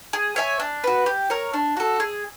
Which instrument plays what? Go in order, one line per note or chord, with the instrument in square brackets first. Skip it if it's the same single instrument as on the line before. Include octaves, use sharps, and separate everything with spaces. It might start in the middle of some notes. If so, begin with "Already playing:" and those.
[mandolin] G#4
C#5 E5 G#5
D4
F#4 B4
G4
A#4 C#5
D4
F#4 A4
G#4